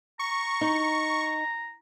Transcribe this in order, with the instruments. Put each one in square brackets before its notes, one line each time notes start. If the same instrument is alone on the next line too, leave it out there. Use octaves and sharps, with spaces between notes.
[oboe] A#5 [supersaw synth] C#6
[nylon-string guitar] D#4